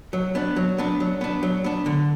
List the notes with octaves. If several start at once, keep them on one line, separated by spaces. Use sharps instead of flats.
F#3
B3 D4
F#3
B3 D4
F#3
B3 D4
F#3
B3 D4
D3